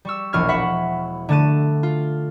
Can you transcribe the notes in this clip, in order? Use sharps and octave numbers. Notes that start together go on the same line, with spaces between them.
G3 C#6 E6
E1 A#1 C#6 F6 G#6
E5 F#5 B5 C#6
D3 A3 A5 F#6 D#7
F4